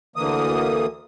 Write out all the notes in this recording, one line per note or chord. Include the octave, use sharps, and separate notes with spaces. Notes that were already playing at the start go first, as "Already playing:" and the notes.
D2 D3 E3 A#3 D#6